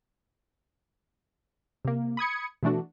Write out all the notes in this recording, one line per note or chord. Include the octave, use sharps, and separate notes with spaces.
C3 A#3
B5 D#6 G#6 C#7
B2 E3 A3 D4 F#4